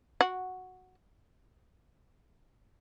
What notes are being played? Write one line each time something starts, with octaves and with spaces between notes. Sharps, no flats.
F#4